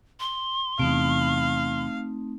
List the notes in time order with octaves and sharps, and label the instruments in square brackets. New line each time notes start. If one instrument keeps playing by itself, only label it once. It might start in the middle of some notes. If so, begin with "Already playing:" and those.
[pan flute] C6
[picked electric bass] E2 C3 [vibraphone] A3 C4 D#4 [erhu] F5